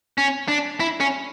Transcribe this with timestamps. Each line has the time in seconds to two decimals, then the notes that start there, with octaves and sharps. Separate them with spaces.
0.18 C#4
0.48 D4
0.80 E4
1.00 C#4